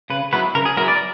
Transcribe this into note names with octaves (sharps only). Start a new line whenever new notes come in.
C#3 B4
F#3 B3 E4 B4
C#3 A#4
G#4
F#3 B3 E4 A#4
D5